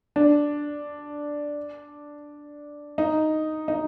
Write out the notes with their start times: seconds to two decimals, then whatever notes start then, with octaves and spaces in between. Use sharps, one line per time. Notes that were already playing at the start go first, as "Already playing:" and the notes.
0.16 D4
2.98 D#4
3.68 D#4